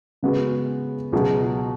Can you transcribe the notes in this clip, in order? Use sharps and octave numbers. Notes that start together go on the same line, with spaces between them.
C#3 G#3 B3 F#4
C#2 B2 F#3